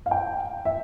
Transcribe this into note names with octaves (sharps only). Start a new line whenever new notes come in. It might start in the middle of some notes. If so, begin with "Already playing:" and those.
F5
G5
E5